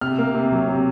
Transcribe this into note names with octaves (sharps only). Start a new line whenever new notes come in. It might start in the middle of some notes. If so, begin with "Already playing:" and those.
C3 F6
A#3
C3
F#3
C3